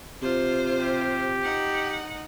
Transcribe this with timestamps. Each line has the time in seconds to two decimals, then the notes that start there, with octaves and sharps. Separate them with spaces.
0.22 C3 F4 C5
0.80 G4
1.43 D#4 F#5